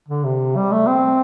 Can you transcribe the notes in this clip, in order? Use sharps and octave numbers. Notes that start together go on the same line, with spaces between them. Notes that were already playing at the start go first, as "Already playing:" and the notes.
D3
C3
G3
A3
C4